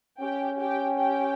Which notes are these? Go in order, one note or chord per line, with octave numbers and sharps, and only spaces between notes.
C#4 G4 G5
G4 G5
G4 G5